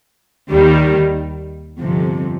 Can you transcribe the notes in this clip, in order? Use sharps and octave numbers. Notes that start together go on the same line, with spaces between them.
D#2 D#3 G3
G1 F2 C3